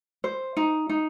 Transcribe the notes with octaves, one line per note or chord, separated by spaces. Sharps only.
C5
D#4
D#4